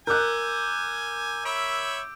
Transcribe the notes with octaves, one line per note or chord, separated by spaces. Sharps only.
A#4 G#5 D6 E6 F#6 G6
C#5 E5 B5 D7